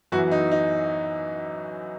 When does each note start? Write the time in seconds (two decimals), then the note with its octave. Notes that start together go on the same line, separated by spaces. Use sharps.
0.12 F#2 E3 B3 F#4
0.31 D#4
0.52 D#4